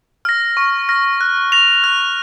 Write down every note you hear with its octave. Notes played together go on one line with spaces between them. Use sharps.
F6 A#6
C#6
F6 A#6
F#6
A#6 F7
F#6